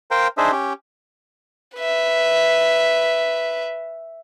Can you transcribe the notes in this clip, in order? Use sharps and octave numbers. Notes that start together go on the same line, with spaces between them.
A#4 C5 F5 G5
D4 D#4 G#4 C5 E5
C#4 G4
B4 E5